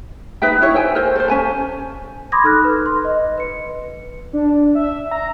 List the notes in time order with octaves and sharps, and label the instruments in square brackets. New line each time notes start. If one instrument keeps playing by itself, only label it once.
[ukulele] D#4 B4 E5 G5
D#4 E4 C#5
A4 C5 G5 G#5
A#4 C5
A4 C5
C#4 G#5 A5
[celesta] B5 C6 D6 D#6 G#6 A#6
D#4 A4 F6 F#6 A#6
B4
C6
D#5
B4 C#7
[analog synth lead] D4
E5
A#5